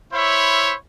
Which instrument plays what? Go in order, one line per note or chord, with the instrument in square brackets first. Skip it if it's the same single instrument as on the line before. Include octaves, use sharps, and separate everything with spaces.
[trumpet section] E4 C5 C#5 E5 B5